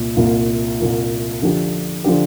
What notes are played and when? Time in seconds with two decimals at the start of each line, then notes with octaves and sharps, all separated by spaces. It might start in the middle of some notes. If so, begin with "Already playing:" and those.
Already playing: C2 A#2 A#3 F4
0.16 C2 A#2 A#3 F4
0.79 C2 A#2 A#3 F4
1.42 D3 F3 D4 G4
2.04 D3 F3 D4 G4